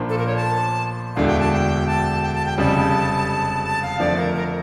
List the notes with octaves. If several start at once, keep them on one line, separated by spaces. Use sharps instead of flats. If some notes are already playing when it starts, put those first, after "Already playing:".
Already playing: A#1 A#2 F3 A#3 D4
A4
A#4
C#5
A5
E1 D2 D3 A3 D4 F5
G5
A5
G5
A5
G5
A5
G5
F1 F2 C#3 G3 A5
A5
F5
F2 D3 F3 A3 D5
A#4
A#4